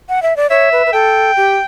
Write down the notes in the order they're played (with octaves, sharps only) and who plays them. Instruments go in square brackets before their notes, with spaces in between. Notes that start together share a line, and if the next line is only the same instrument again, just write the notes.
[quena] F#5
E5
D5
[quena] C#5 [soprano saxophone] E5
[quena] B4
B4
[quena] A4 [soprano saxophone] G5
[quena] G4